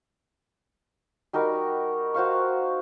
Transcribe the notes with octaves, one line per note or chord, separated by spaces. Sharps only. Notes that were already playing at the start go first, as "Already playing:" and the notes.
G3 D#4 F#4 A#4
F#4 C5 F5 C#6